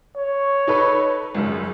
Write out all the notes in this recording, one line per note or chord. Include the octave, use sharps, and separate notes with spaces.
C#5
D#4 A4 B4
G#1 C#2 F#2